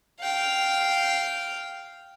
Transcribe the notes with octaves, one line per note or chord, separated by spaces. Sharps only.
F5 G5